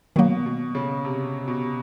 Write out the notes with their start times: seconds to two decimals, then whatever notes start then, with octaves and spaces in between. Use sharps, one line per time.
0.16 B2 D#3 F#3 A#3
0.46 B2
0.75 C#3
1.05 C3
1.48 B2